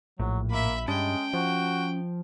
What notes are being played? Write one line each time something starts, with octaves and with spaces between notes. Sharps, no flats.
A#1 A2 F#3
A#3 E5 B5
G2 G#3 C#4 D#5 G5 A5
F3 F#4